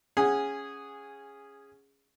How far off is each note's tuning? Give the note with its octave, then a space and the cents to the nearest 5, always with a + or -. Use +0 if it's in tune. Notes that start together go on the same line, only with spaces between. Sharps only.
C#4 +0 G#4 -10 F#5 +0